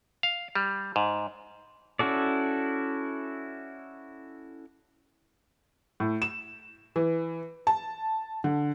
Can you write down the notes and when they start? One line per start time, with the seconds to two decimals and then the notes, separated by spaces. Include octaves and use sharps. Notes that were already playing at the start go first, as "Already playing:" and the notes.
0.23 F5
0.55 G3
0.96 G#2
1.99 C#4 E4 F#4 A4 D5
6.00 A2
6.22 E7
6.96 E3
7.67 A5
8.44 D3